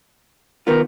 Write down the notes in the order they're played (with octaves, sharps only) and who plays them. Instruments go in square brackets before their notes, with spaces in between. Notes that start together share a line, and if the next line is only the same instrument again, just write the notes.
[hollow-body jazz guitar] D#3 B3 F4 [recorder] A#4